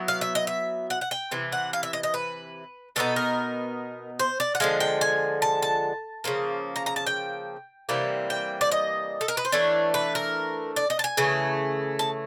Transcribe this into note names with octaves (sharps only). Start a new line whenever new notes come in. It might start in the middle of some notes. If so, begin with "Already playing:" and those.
Already playing: F#3 B3 E4
F5
E5
D#5
E5
F#5
F#5
G5
C3 E3
F#5
F5
E5
D#5
D#5
B4
B2 F#3 B3 D#4 A4
A#4
C5
D5
F#5
D3 F3 G#3 F5
G5
G#5
A5
A5
C#3 F3 A#3
A#5
A#5
A5
G5
C3 E3 G3 A#3
G5
D5
D#5
A4
A#4
B4
C5
E3 A3 D4 C#5
B4
A#4
D5
D#5
A5
G#5
C#3 E3 A3
A5